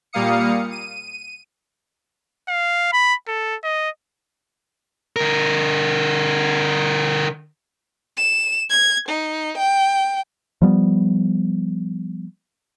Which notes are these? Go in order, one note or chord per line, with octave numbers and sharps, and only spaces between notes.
A#2 G3 A#3 F5 D#6 C#7
D#7
F5
B5
A4
D#5
D3 A#4
E7
G#6
D#4
G5
F3 G3 B3